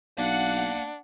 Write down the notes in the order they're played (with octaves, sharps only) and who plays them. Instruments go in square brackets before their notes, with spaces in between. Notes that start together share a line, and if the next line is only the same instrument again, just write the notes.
[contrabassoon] B1 [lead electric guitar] A#3 F5 [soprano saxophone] D4 [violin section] F#5